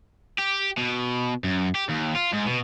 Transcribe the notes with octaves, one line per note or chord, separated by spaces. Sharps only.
G4
B2
F#2
G4
D#2
F4
G#2
B2